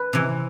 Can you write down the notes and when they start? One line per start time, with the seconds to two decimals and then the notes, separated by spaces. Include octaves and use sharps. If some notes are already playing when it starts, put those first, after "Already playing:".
Already playing: B4
0.13 C3 E3